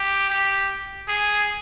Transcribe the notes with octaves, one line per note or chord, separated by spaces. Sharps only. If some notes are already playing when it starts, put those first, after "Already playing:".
Already playing: G4
G4
G#4